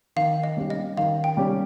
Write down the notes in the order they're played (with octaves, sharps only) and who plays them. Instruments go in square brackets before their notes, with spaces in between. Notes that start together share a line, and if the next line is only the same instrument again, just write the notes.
[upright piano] D#3 [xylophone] F5
[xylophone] D#5
[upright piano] G3 C#4 G4
[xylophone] D#5
[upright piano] D#3 [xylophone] F5
[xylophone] G5
[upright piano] G3 C#4 G4